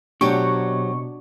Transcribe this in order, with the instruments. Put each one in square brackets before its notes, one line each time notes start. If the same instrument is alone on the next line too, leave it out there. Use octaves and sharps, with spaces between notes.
[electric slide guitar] B2 [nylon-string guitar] F#3 C4 G4 [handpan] D4 F#4 [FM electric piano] C#6